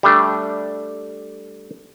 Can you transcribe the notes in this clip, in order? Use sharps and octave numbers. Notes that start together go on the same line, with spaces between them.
G3 A3 D4